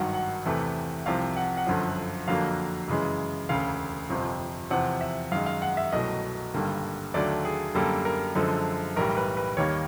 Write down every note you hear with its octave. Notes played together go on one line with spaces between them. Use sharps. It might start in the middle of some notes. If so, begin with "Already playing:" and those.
Already playing: G#1 G2 D#3 F#3 F#5
F#5
E2 C3 E3 A3
C2 C3 F3 F5
F#5
F#5
G1 F#2 D3 F3
F2 D3 F#3 A#3 F5
F#2 C#3 E3 G#3
E1 D2 C#3 F5
G1 F2 C3 F3
E2 C3 F3 F#5
E5
F#2 D#3 G#3 F5
F5
F#5
E5
C2 B2 F#3 A3 D#5
G#1 G2 D3 G3 A#3
D#2 D3 F#3 A3 D5
G#4
F#2 D3 G3 A#3 A4
A#4
F#2 D3 F3 G#3 A4
B1 A2 E3 G3 A#4
B4
B4
D#2 D#3 G3 A#3 C#5